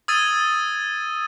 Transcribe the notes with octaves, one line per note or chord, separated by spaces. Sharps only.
D#6 E6 G#6 A6 D#7